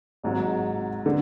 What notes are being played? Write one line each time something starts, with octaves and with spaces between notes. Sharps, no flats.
G#1 G#2 F#3
D3